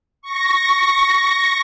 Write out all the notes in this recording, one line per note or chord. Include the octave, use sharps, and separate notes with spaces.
C#6 A#6